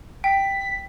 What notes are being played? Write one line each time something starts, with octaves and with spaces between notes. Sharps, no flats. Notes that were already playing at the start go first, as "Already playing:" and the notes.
G5 B6